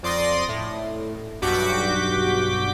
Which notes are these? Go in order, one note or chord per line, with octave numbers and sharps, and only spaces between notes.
F2 D5 C6 D#6 A#6
A2
B1 G2 F#4 D6 G6 B6